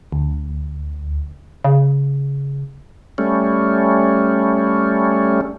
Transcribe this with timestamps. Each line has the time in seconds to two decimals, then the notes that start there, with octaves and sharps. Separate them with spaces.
0.12 D2
1.65 C#3
3.18 G3 A3 C#4